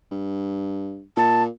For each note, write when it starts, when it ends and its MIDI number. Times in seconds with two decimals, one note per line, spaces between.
0.11 1.03 43
1.17 1.48 46
1.17 1.43 81